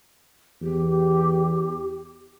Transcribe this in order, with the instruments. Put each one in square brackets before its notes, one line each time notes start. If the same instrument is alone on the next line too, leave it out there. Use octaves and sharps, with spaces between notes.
[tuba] E2 [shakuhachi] G4